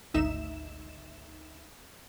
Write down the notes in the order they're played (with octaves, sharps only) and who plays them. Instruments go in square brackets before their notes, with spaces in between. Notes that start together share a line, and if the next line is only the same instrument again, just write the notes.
[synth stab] G#1 D2 D#4 E5 E7